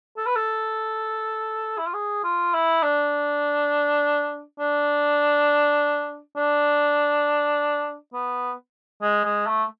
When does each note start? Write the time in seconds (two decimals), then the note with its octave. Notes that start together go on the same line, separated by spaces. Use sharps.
0.18 A4
0.27 B4
0.36 A4
1.78 E4
1.87 F4
1.94 G#4
2.24 F4
2.54 E4
2.83 D4
4.60 D4
6.37 D4
8.13 B3
9.02 G#3
9.25 G#3
9.47 A3